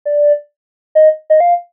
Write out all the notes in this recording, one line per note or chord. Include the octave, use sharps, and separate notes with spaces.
D5
D#5
D#5
F5